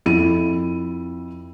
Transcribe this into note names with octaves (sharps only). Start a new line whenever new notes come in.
F2 E4 D#7